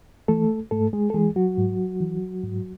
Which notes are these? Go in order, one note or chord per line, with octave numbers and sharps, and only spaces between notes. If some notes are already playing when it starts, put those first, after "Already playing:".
E3 A3 A4
G#2 A3 A4
G#3 G#4
A4
E3 G#3 G#4
F#3 F#4
G#2
E3
G#2